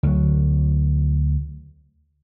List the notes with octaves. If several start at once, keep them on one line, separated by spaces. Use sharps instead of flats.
D2 F#3